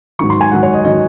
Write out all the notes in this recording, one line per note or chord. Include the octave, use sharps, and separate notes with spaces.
G#2 D#3 F#3 C#6
C6
G#5
G#2 D#3 F#3 F#5
C#5
D#5
D#3 F#3 D#5